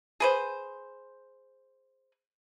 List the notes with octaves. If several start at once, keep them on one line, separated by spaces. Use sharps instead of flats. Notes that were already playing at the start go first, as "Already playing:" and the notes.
G#4 B4 C5